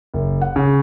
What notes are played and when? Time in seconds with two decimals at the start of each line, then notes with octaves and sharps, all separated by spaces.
0.14 F#1
0.42 F#5
0.56 C#3